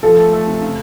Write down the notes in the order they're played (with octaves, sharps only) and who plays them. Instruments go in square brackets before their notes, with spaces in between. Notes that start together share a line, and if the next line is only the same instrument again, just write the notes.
[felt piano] F3 [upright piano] A4
[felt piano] A3
A3
C3
C#3